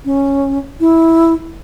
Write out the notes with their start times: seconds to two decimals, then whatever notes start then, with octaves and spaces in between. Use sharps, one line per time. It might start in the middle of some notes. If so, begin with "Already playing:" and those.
0.05 C#4
0.80 E4